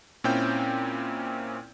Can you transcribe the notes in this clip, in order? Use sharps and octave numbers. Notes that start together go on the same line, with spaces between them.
A#2 C4 C#4 E4 G5 G6